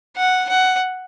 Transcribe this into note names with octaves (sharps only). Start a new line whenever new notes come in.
F#5
F#5